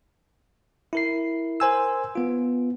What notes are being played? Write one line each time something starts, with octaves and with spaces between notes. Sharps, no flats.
E4 A#4 C7
A#4 C5 G#5 E6
B3 F4